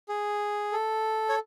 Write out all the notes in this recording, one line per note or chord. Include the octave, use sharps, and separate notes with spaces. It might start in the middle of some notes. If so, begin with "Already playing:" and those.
G#4
A4
C#5